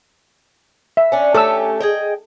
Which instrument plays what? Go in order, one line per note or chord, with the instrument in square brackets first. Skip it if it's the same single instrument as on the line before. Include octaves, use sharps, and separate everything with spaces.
[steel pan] E5
[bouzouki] C#4 D4
[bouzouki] A3 C#4 G4 [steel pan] A4 E6
[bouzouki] G#4 D#5 G5